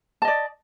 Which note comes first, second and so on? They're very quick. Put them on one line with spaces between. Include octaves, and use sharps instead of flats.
A5 D#5 D5